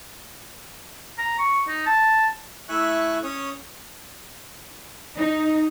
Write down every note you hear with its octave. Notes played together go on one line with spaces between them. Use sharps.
A#5
C#6
D#4
A5
A3 E4 E5 G#5 C#6 F#6
C#4 C#5 D#6
D#4